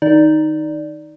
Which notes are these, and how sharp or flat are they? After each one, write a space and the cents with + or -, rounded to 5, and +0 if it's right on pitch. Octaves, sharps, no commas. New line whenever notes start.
D#3 +0 D#4 +0 D5 +0